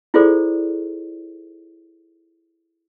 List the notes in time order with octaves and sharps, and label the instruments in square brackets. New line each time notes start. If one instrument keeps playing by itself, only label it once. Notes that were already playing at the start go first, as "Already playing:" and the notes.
[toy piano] E4 F4 G#4 A4 C5 D5